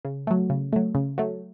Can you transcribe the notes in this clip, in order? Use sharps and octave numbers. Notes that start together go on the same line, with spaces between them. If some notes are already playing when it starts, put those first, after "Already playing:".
C#3
F#3 A3
C#3
F#3 A3
C#3
F#3 A3